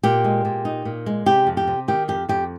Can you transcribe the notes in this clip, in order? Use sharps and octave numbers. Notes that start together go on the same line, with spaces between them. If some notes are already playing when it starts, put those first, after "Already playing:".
A#2 G4
G#3
A#2
D#4
A#2
G#3
C3 G4
F2
G4
C3
D#3 G4
F2 G4
F2 G4